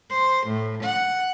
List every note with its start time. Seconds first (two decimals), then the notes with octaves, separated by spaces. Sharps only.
0.10 C5
0.47 A2
0.84 F#5